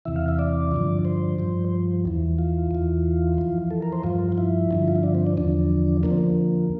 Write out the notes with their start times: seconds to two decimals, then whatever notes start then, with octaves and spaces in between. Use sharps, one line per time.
0.05 E2 C3 E3 E5
0.16 F5
0.28 E5
0.39 D5
0.71 G2 D3 F3
1.05 C5
1.38 G2 F3
2.05 E2 E3
2.39 F4
2.71 E2 E3
3.38 F2 E3
3.71 A4
3.82 A#4
3.92 C5
4.03 G2 F3 F4
4.32 F4
4.38 E4
4.71 G2 D3 F3
4.88 F4
4.96 E4
5.03 D4
5.15 C4
5.26 D4
5.37 E2 D3 F3 D4
6.03 F2 D3 F3 A#3
6.11 C4
6.18 A#3